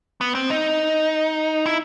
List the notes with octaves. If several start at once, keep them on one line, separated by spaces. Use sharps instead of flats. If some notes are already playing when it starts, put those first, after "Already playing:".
B3
C4
D#4
E4